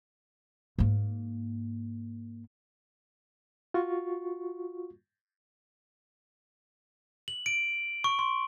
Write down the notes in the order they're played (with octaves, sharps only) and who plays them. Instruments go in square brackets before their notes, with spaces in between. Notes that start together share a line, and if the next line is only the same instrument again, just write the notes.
[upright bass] G#2 A#3
[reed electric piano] F4 F#4 C#6
[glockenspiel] F#7
D7
C#6
C6